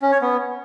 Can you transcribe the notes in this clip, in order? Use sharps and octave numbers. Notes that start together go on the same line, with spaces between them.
C#4
C#5
B3